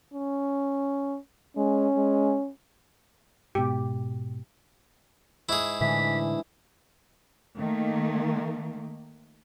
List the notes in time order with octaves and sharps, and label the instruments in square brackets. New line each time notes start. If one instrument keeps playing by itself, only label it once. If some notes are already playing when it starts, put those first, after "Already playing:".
[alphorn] C#4
[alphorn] G#3 [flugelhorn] C#4
[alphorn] G#3
[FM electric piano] G#2 B2 [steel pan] G4
[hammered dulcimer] G#2 [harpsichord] E4 G#4
[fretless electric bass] A2 D3 G#3 [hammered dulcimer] E3 D4 [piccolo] B6
[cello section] D#3 A3 A#3